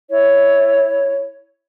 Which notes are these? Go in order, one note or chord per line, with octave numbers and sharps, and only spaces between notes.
E4 C#5